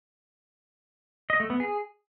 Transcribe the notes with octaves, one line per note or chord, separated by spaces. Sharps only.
D#5
A3
B3
G#4